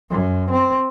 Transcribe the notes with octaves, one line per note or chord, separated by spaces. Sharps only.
F#2
C4